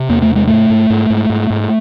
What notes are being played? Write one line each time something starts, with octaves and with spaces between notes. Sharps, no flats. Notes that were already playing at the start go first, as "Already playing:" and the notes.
Already playing: C3
E2 A#3
A3
C3
G#3
G#2 A3
G#2
G#2
G#2
G#2
G#2